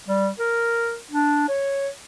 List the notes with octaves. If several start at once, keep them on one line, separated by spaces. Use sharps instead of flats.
G3
A#4
D4
C#5